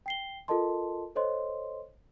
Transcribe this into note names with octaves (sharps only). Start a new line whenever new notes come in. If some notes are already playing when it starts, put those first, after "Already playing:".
G5 C7 G7
F4 A4 A#4 D#5 A5 C6
A4 C5 C#5 D#5 C6